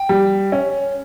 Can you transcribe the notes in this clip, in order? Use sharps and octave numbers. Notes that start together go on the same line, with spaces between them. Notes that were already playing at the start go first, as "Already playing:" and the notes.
Already playing: G5
G3
C#4